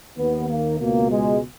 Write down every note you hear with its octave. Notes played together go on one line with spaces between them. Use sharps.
D#2 D#3 B3
A#3
C#2 B2 A#3
G#3